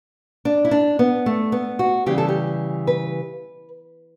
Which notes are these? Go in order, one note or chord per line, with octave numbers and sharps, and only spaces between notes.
D4
E4
D4
B3
A3
B3
F#4
C#3 E3 G3 G4
A4
G4
B4